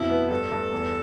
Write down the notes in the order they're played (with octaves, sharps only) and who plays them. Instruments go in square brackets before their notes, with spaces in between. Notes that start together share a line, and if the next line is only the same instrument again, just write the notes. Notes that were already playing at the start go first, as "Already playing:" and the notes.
Already playing: [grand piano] F2 B2 [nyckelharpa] E4
[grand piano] B3
[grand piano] G2 [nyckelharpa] A4
[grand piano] G2
E2